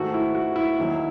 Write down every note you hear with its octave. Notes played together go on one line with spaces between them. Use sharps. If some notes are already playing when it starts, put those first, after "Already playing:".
Already playing: G#2 D#3 A3 F#4
E4
F#4
E4
D#2 D#3 F#3